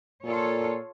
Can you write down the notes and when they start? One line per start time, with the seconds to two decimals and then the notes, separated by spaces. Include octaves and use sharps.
0.24 A#2 F4 A4 C#5